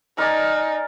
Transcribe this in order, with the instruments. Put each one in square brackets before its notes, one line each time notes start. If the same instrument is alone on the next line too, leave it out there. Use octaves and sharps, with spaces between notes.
[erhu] D#4 [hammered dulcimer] A#4 D5 G#5